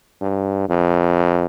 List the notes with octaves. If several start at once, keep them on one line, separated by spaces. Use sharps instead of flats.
G2
F2